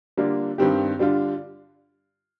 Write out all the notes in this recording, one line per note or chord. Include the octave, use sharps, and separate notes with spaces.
D3 G3 A#3 D4 F4
G2 D#3 G3 C4 G4
D3 G3 D4 F4